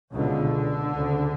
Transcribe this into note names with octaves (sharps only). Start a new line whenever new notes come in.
C#2 B2 D3
D2 C#3